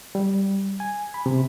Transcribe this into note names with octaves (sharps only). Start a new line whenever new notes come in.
G3
G#5
B5
C3